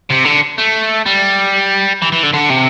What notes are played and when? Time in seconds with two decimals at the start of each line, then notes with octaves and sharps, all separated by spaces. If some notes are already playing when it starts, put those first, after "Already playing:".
0.10 C3
0.25 D3
0.58 A3
1.06 G3
2.02 E3
2.12 E3
2.23 D3
2.34 D3
2.50 C3